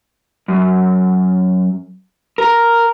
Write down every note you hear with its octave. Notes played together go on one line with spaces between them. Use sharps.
F#2
A#4